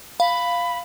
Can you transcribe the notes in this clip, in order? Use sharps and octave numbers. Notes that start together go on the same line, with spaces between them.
F5 B5